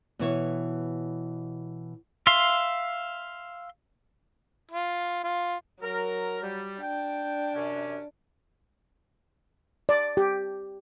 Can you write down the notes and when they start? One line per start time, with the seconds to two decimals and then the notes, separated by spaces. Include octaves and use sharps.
0.19 B2 E3 C#5
2.27 E5 F5 C6
4.71 F4
5.24 F4
5.82 F#3 A#4
6.42 G3
6.80 D4 G5
7.56 F#2 C3 C#4
9.89 D5
10.17 G4